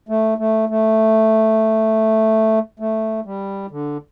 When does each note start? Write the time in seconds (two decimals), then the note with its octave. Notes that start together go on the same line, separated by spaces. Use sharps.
0.09 A3
0.38 A3
0.69 A3
2.80 A3
3.26 G3
3.70 D3